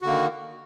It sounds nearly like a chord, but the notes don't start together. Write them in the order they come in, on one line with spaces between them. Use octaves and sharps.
F#4 D3 A#3 D#3